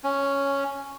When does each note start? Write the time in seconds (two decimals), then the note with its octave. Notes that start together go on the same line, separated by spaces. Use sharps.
0.04 C#4